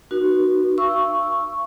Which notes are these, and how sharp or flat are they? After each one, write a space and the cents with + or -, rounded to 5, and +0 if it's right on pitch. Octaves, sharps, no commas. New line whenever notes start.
D#4 -40 F#4 +0 B4 -45
F5 -45 C#6 +0 E6 +0